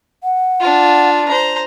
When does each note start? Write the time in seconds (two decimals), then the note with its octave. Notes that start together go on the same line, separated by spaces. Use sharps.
0.24 F#5
0.60 D4 F4
1.28 C5 A#5